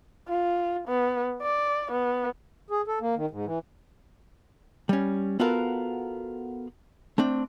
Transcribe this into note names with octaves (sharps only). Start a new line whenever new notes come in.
F4
B3
D5
B3
G#4
A4
A#3
D#3
G#2
E3
G3 C#4
B3 F4 F#4 A4 A#4 F5
A3 C4 D4